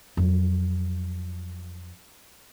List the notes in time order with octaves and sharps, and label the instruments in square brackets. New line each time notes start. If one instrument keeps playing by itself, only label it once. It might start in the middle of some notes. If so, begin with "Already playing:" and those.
[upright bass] F2 F#3